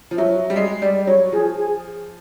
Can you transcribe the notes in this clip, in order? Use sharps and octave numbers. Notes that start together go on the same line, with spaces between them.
F3
F#3 E5
G3
G#3 D#5
G3 D5
F#3 C#5
F3 G#4
G#4